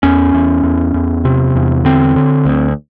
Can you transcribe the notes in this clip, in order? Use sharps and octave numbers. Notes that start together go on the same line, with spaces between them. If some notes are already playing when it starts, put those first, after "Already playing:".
E2 C#4
E2
E2
E2
C3
E2
D3 C4
D3
D2